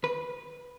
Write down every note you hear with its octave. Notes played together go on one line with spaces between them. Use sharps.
D#2 B4